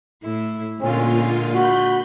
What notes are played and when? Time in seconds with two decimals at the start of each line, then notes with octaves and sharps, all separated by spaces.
0.23 A2 E4
0.81 A#2 D3 G#3 C#4 F4
1.54 F#4 B5 G6